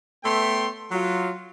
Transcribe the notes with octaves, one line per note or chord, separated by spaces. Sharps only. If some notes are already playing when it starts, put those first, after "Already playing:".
A3 B3 C#5 E5 G5 C6
F#3 F4